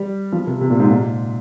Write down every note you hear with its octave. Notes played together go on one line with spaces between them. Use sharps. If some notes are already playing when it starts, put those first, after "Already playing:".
Already playing: G3
F3
C3
C3
A#2
G#2
A#2